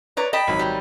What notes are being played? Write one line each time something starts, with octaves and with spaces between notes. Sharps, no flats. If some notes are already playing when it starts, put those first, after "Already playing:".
B4 C#5 D5 A#5
D#5 G5 A5 B5
G#1 F#3
G3